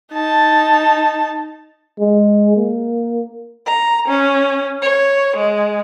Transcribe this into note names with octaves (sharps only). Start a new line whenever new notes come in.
D#4 A5
G#3
A#3
A#5
C#4
C#5
G#3